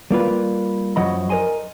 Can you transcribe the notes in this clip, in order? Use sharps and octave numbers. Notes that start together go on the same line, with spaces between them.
G3 A#3 F4 B4
F#2 F3 F#3 D#5 B5
A#4 B4 D#5 G#5 C6